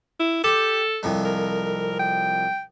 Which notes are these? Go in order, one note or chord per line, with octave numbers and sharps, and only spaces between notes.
E4
G4 A4
C2 F2 G#3
A#4
G5